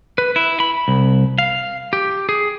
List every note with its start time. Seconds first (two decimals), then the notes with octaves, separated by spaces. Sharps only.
0.18 B4
0.36 E4
0.60 B5
0.88 C2
1.38 F5
1.93 G4
2.29 G#4